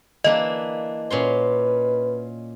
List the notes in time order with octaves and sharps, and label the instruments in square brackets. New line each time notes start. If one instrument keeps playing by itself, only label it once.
[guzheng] E3 A#3 D4 [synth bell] D#5
[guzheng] A#2 C#4 C6 [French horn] B4